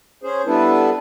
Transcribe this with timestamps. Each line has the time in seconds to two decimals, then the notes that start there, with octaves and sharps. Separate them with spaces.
0.24 C#4 G#4 C5
0.46 G3 B3 D4 E4 A4 B4